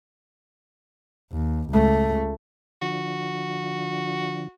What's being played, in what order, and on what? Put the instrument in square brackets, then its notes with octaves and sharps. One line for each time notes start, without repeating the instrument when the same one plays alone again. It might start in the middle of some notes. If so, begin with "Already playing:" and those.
[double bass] D#2
C#2 A3
[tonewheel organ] D3 F3 [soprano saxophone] F#4